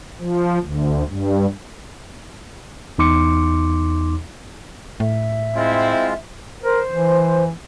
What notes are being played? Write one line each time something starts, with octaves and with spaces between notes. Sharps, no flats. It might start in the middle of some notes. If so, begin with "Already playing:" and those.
F3
D2
G2
E2 D#4 C6 D6 C#7
A2 E5
G#3 C4 E4 F4
A#4 C5
E3